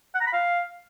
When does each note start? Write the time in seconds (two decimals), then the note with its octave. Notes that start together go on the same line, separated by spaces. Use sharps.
0.15 F#5
0.21 A#5
0.27 B5
0.33 F5